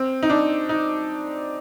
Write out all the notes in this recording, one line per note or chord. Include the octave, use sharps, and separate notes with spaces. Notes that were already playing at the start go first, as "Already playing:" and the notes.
Already playing: C4
D#4
D4
D#4